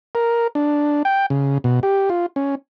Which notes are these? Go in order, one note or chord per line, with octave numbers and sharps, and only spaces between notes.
A#4
D4
G5
C#3
B2
G4
F4
C#4